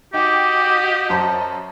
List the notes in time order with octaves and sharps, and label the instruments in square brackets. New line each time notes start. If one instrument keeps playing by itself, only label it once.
[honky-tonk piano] D#4 G5 [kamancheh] F#4 D#5 [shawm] G4 [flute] D6
[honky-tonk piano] F#2 C5 A#5 [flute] A5